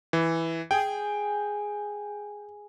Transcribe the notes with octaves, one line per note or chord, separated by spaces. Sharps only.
E3
G#4 G5